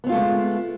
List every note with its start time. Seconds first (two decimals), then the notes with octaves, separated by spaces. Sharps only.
0.04 B3
0.07 C4
0.09 F4
0.12 A3
0.15 G#3